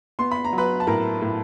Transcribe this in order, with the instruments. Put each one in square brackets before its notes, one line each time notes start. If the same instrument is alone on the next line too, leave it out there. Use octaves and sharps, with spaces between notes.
[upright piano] B3 C6
B5
A#5
F#3
B4 B5
A5
A2 A#4 A#5
A2